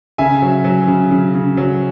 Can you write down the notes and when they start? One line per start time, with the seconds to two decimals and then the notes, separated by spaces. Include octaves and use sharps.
0.18 C#3 E5 G#5
0.42 F#3
0.64 F#3
0.88 C#3
1.11 C#3
1.34 C#3
1.57 F#3